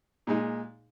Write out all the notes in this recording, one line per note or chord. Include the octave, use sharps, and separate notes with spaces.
A#2 G#3 D#4